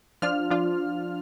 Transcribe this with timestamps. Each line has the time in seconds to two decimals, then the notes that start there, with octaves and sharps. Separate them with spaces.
0.22 F3 D4 F4 F6
0.51 F3 D4 F4